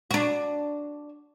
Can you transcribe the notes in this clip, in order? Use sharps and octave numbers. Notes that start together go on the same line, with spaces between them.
D4 F#4